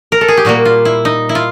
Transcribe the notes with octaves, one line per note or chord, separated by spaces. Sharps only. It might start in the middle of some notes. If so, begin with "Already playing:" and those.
A#4
A4
G#4
G4
A#2 G3 A#3 F#4
F4
E4
D#4
E4
F4